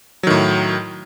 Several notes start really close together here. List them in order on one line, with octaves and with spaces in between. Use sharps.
F#3 D#3 A2